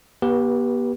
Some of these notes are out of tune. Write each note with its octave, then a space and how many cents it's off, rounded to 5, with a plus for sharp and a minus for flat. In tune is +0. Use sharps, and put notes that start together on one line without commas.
B3 -45 G4 +0 B4 -25